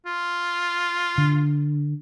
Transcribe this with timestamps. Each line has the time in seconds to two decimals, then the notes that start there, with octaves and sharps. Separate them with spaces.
0.06 F4
1.18 D3